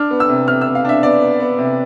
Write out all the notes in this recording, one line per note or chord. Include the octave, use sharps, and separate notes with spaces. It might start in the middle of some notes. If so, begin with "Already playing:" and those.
Already playing: D4 F6
B3
E6
C3
C3 F6
B3 E6
F5
D4 E5
B3 D5
B3
B3
C3